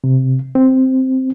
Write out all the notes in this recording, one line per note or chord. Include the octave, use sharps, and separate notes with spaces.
C3
C4